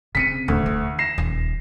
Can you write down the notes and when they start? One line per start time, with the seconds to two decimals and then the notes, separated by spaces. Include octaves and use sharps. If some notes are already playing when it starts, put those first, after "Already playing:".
0.15 C#3 C4 B6 C#7 D#7
0.48 D#1 D2
0.66 E3
0.99 A#6 C7 E7
1.18 D#1